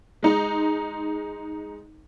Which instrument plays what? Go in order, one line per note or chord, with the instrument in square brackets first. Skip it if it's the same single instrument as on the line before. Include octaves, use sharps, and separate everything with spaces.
[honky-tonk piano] G#3 D#4